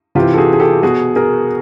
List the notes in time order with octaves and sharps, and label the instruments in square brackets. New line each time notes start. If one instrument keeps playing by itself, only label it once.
[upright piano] C3 E3 F4 G4
A4
F#4 G#4
G#4
G4 A4
B2 F#4 G#4
G#4 A#4